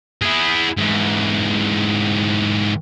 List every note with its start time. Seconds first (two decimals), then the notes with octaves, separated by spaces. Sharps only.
0.22 E4 G#4
0.78 G#2 E3